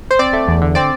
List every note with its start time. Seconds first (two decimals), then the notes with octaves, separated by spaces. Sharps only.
0.11 C5
0.19 C4 D5
0.33 A3
0.48 E2
0.62 D3
0.75 C4 D5